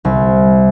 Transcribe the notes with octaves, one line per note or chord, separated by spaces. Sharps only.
C2